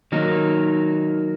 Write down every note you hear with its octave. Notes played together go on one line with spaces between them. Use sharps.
D#3 F#3 A#3 D#4